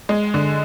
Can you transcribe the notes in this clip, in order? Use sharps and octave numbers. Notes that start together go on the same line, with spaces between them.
G#3
D3